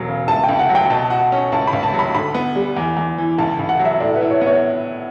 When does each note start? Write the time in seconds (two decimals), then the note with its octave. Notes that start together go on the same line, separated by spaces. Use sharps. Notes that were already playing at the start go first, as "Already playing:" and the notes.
Already playing: E1 F#3
0.08 C#3
0.28 C#2 A5
0.44 G5
0.49 C#2
0.59 F#5
0.69 F#3
0.75 G5
0.90 B2 A5
1.10 F#4
1.32 C#4
1.52 C#2 A5
1.67 B5
1.73 C#2
1.83 A5
1.93 F#3
1.99 B5
2.14 D2 B5
2.34 B3
2.55 G3
2.77 E2
2.97 E2
3.18 E3
3.38 C#2 A5
3.59 C#2
3.69 F#5
3.79 F#3
3.85 E5
4.00 A2 D5
4.16 B4
4.21 E4
4.31 C#5
4.41 B3
4.46 C#5